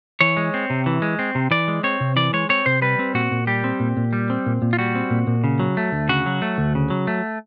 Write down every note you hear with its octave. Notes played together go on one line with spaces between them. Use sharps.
E3 C#5
G#3
C4
C3
E3
G#3
C4
C3
E3 D5
G#3
C4 C#5
C3
E3 D5
G#3 C#5
C4 C#5
C3 C5
G3 B4
C4
A#2 F#4
A#2
G3 G4
C4
A#2
A#2
G3
C4
A#2
A#2
F4
G3 F#4
C4
A#2
A#2
C#3
F#3
A3
D2
C#3 F#4
F#3
A3
D2
C#3
F#3
A3